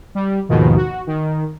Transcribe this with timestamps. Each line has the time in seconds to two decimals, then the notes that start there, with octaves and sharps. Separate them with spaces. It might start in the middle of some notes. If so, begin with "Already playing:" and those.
0.15 G3
0.49 D#2 G#2 B2 D#3 F3
0.76 F#4
1.07 D#3